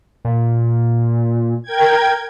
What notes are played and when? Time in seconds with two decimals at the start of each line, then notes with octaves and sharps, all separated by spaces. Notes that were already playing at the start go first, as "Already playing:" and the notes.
0.25 A#2
1.63 A#4 G5 G#6